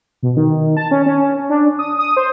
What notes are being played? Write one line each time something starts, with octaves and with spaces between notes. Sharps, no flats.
B2
D#3
A5
C#4
C#4
D4
D#6
D#6
C5